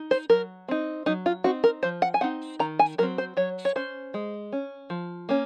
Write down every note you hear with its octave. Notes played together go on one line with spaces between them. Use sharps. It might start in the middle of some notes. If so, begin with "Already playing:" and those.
Already playing: D#4
C5
F#3 A#4
C4 D#4
F#3 D#4
F4
C4 D#4 F#4
A#4
F3 C5
F#5
G#5
C4 D#4 F#5
D#3 A#5
G#5
F#3 C4 A#4
C5
F#3 C#5
C#5
C#4 C5
G#3
C#4
F3
A#3 C#4